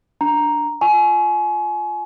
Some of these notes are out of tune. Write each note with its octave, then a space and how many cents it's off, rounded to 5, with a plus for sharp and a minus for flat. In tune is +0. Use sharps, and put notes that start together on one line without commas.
D4 +0 A#5 +0
F4 +0 G#5 +30 C#6 -5